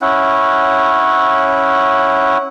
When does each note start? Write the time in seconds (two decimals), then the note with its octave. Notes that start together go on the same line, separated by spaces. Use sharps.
0.01 C#4 E4 F#5